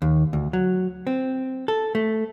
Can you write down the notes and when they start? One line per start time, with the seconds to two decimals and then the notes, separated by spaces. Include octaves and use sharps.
0.02 D#2
0.33 D2
0.53 F#3
1.07 C4
1.68 A4
1.95 A3